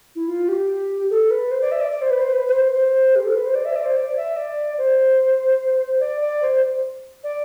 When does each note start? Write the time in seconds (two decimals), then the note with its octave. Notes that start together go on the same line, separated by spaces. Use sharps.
0.16 E4
0.28 F4
0.49 G4
1.10 A4
1.31 B4
1.51 C5
1.61 D5
1.72 E5
1.81 D5
1.92 D5
2.02 C5
2.11 B4
2.21 C5
2.33 B4
2.46 B4
2.53 C5
2.74 C5
3.15 G4
3.25 A4
3.36 B4
3.46 C5
3.55 D5
3.65 E5
3.76 D5
3.85 C5
3.97 D5
4.17 E5
4.37 D5
4.78 C5
6.00 D5
6.21 D5
6.42 C5
7.24 D5